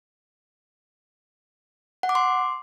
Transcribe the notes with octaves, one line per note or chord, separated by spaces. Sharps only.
F#5
D6
C6